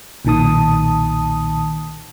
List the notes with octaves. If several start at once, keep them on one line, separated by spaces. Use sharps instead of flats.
B1 A#2 D#3 A5 D#6